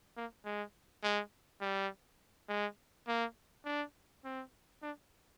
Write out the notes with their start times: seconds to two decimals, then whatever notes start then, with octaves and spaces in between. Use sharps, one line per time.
0.17 A#3
0.45 G#3
1.03 G#3
1.61 G3
2.49 G#3
3.07 A#3
3.65 D4
4.25 C4
4.82 D4